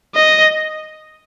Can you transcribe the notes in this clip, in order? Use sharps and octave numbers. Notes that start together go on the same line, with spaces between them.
D#5